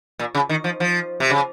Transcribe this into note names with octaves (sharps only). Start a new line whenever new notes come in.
A#2
C#3
D#3
F3
F3
C3
C#3